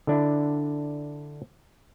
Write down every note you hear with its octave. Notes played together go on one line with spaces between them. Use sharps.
D3 D4 E4